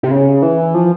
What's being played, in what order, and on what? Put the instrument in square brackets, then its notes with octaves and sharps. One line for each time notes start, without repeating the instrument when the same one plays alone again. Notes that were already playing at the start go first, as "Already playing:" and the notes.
[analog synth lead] C3
C#3
E3
F3